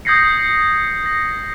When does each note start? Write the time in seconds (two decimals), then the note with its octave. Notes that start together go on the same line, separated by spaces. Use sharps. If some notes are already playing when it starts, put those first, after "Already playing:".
0.05 D#6 G6 G#6 A#6 C7 C#7
1.06 A#6